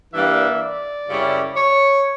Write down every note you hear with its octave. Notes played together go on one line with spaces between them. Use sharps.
G2 E3 G3 A#3 D4 E5
D5
F#2 C#3 G3 C#4 E4
C#5